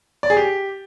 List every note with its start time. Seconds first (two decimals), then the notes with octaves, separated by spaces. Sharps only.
0.23 D5
0.30 G#4
0.37 G4